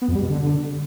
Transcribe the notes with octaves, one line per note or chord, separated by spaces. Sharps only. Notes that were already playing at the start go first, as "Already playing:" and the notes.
B3
F2
G3
B2
D3